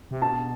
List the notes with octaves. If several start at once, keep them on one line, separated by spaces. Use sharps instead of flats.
C3
B2 A5